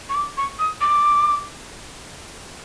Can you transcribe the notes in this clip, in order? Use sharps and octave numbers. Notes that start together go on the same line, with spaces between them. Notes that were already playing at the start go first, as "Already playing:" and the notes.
C#6
D6
C#6
D#6
D6